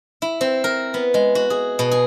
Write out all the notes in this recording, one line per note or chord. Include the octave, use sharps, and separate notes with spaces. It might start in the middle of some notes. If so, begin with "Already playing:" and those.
E4
C4
A#4
B3
G#3
F#4
G#4
B2
G#4